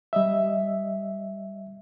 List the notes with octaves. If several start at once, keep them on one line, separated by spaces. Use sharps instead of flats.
G3 D#5 E5